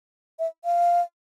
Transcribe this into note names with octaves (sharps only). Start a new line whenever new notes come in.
E5
F5